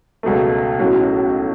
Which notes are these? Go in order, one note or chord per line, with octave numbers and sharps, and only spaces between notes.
C#2 B2 F#3 A3
B1 A2 F#3 C#4 F#4